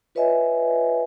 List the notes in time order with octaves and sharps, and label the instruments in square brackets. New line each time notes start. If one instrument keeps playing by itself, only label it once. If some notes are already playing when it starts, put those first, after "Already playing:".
[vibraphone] F4 B4 C#5 D#5 E5 G#5